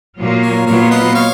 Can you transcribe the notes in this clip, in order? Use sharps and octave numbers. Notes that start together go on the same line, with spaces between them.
A#2 F#3 A#3 F4
A#4 C#5
A#2 F#3 B3 F4 A#4 C#5
B4 D#5
C#5 F5